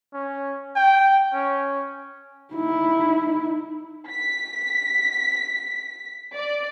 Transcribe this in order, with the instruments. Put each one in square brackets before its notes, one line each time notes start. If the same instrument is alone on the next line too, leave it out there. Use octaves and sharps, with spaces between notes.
[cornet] C#4
G5
C#4
[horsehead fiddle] D#4 E4
[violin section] B6
D5